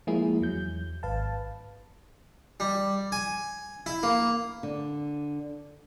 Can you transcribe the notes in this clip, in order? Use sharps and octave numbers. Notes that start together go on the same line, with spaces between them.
F3 G#3 A#3 E4 G#4
E2 F#3 G6
G#1 B4 F5 A5
G3
G#5
E4
A#3
D3